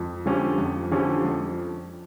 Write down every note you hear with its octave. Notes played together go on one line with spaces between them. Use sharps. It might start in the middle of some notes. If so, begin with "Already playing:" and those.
Already playing: F2
D3 F3 C#4 G4
F2
D3 F3 C#4 G4
F2